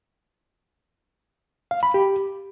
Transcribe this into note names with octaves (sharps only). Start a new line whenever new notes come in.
F5
B5
G4